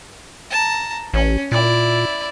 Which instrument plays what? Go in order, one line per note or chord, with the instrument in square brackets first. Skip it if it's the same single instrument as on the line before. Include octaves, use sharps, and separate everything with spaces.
[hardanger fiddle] A5 A#5
[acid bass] A1 [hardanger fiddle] C#4
[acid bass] A#2 [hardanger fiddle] E4 D5